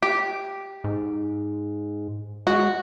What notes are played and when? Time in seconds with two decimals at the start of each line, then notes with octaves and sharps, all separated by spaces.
0.02 G4
0.84 G#2
2.47 G#3 F#4